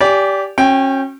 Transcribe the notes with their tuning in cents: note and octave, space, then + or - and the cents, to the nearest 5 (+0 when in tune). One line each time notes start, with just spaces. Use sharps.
G4 +0 D5 -25 G#5 +0
C#4 -30 F#4 -15 G5 +0